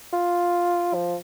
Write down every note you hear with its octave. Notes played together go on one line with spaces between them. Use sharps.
F4
F3